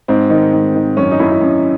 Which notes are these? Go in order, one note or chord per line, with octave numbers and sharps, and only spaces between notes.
G#2 C4
D#3
G#2
D#3
F#2 C#4
D#4
F#2 E4
E4
F#2